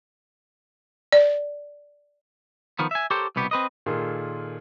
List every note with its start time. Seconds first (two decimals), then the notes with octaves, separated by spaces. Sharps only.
1.12 D5
2.79 D#3 F3 B3
2.91 E5 G#5
3.11 G4 A4 A#4 C5 C#5 G5
3.36 C2 B2 B3 G4
3.51 C4 B4 D#5
3.86 A#2 D#3 F4 G#4 A4